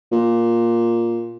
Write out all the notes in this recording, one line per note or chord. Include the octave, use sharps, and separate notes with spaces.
A#2